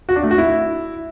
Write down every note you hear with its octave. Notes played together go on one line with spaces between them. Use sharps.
F#4
D4
A3
F#4
E4